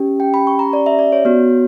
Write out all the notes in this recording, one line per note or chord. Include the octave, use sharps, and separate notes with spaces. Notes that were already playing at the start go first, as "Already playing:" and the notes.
Already playing: C#4 G4
G5
B5
C#6
A#5
D5
E5
D5
C#5
B3 F#4